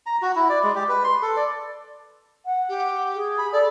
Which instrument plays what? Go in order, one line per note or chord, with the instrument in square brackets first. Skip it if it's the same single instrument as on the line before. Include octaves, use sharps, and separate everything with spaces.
[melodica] A#5
F#4
E4
D5
G#3
G4
B4
C6
A4
D5
[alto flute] F#5
[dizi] G4
[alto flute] G#4
[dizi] B5
[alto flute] A4 [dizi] D5